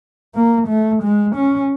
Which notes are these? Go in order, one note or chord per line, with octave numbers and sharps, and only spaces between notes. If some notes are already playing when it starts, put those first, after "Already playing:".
A#3
A3
G#3
C#4